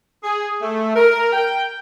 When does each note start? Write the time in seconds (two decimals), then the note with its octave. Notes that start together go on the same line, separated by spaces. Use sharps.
0.24 G#4
0.62 A3
0.96 A#4
1.33 G5